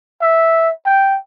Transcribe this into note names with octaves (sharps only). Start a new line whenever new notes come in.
E5
G5